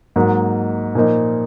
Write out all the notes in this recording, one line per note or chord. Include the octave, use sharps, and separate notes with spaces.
G#2 F#3 A#3
A#2 F3 A#3 D#4